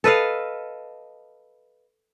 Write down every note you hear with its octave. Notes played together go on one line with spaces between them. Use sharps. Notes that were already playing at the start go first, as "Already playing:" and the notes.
A4 B4 D#5 F5